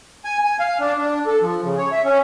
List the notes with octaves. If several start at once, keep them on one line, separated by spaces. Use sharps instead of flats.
G#5
G#5
F5
D4
D4
A4
F3
C#3
C#5
E5
C#4